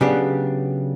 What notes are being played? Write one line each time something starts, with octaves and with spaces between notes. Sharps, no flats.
C#3 F#3 B3 D4 G4